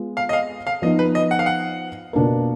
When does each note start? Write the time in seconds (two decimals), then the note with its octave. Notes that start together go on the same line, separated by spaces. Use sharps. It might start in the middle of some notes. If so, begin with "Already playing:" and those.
Already playing: G#3 B3 F4
0.17 F5
0.29 D#5
0.33 F5
0.67 F5
0.82 F3 B3 D#4 D#5
0.99 B4
1.15 D#5
1.31 F#5
1.39 F5
1.46 F#5
2.13 B2 A#3 D4 F4 A#4